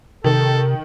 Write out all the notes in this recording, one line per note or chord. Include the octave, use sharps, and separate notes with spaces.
C3 D#3 A4